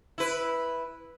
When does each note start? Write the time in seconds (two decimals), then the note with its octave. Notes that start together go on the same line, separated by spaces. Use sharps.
0.18 E4 B4